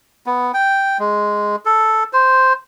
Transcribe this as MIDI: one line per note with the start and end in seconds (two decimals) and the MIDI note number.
0.26 0.52 59
0.54 0.97 79
0.99 1.56 56
1.65 2.04 69
2.13 2.53 72